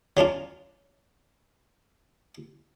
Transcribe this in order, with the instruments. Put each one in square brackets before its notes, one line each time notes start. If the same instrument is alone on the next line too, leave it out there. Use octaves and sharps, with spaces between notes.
[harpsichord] F#3 C#4 D4 F4